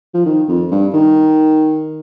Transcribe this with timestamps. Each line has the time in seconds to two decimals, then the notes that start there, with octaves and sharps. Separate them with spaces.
0.14 F3
0.26 D#3
0.48 F2
0.71 G2
0.93 D#3